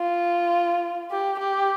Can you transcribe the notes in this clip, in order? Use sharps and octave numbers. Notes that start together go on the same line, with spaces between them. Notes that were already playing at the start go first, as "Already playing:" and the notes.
Already playing: F4
G4
G4